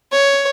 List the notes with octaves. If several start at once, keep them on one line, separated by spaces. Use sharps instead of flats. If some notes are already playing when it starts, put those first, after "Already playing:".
C#5